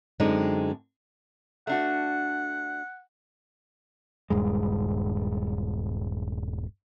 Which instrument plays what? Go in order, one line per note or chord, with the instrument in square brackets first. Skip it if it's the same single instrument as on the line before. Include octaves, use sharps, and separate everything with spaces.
[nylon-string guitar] F#2 D3 G#3 C4 D#4
[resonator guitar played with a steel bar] A3 D4 F#4 [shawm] F#5
[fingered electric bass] D#1 G2 G#3